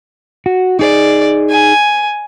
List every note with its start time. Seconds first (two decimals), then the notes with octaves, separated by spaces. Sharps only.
0.46 F#4
0.79 D#4 G#4 D5
1.50 G#5